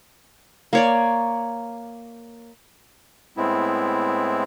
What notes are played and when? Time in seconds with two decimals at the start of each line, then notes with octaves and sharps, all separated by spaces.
0.73 A#3 C#5 D5
3.37 A2 G#3 B3 C4 E4